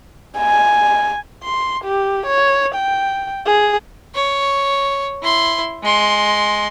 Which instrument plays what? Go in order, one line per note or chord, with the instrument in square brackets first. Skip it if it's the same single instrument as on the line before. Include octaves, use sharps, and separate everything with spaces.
[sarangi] G#5
[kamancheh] C6
G4
C#5
G5
G#4
[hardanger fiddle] C#5
E4 C6
G#3 C6